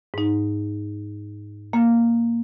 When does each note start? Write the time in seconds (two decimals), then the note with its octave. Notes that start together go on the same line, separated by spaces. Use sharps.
0.14 G#2 D#4
1.73 A#3